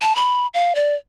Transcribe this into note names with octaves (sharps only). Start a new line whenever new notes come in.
A5
B5
F5
D5